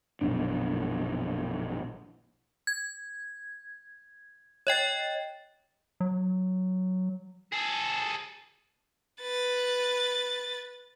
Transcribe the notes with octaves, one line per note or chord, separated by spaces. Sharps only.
A#1 F#2 B2 D4
G#6
C#5 D#5 G5 A6
F#3
G#4 A4
B4 A6